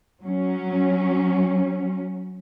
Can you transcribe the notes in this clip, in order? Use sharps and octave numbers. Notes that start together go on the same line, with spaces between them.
F#3 C#4